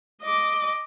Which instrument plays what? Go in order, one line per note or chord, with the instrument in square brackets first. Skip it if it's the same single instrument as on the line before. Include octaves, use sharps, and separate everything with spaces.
[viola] D#5 D6